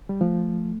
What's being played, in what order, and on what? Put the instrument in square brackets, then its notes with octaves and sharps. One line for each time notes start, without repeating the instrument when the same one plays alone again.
[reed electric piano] G3
[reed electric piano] F3 [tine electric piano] A3